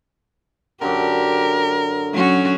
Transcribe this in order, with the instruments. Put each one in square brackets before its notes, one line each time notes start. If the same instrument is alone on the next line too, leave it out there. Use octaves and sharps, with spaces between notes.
[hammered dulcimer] F#2 D3 [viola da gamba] G4 [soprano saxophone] A#4
[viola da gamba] F#3 C#4 F#4